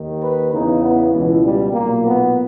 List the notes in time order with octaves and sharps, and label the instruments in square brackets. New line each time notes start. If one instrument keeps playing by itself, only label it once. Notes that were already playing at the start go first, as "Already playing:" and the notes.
Already playing: [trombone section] D#2 D#3
B4
E2 C#3 E3 D#4
B3
C#2 B2 E3
G3
B1 A#2 A#3
B3